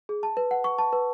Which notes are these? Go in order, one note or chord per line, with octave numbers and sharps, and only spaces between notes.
G#4
A5
B4
F#5
C#6
A5
B4